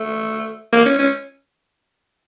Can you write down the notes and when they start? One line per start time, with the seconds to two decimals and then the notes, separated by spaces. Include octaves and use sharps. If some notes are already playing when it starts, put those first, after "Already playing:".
Already playing: A3
0.73 A#3
0.86 C#4
0.99 C#4